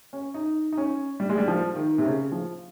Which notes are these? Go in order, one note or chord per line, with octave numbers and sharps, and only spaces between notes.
C#4
D#4
D#4
C#4
G3
G#3
G3
F3
D#3
C3
C#3
F3